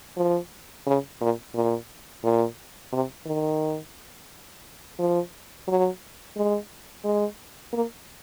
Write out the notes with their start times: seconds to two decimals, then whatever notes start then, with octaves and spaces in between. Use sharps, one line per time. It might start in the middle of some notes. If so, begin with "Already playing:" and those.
0.17 F3
0.87 C#3
1.21 A#2
1.55 A#2
2.24 A#2
2.92 C3
3.26 D#3
4.99 F3
5.68 F#3
6.36 G#3
7.04 G#3
7.73 A#3